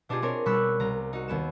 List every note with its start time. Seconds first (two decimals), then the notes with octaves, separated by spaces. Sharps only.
0.09 B2 D4 D#4 F4 G4 G#4
0.22 C4 D4 A#4 C#5
0.46 B2 G3 B5 C#6 E6 F#6
0.80 C2 A#5
1.13 D#4 F#4
1.28 D#2 B3 E7